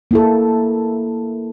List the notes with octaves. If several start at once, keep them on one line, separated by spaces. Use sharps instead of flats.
A#3 E4 A4